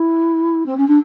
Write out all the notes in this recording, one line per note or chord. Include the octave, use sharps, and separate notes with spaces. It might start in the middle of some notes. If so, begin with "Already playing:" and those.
Already playing: E4
C4
C#4
D4